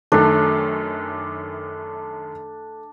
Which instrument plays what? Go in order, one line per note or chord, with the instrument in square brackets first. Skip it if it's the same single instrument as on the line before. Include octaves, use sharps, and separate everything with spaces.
[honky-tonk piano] F#2 D#3 [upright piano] A3 [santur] D4